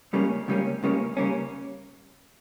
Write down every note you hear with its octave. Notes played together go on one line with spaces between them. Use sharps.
C#2 C#3 G3 A#3 C#4
C#2 C#3 G3 A#3 C#4
C#2 C#3 G3 A#3 C#4
C#3 G3 A#3 C#4